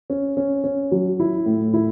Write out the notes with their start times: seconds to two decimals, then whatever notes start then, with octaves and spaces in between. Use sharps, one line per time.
0.10 C#4
0.37 C#4
0.64 C#4
0.92 F#3
1.20 E4
1.46 A2
1.74 E4